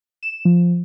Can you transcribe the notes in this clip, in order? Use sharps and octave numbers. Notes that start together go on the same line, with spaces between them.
E7
F3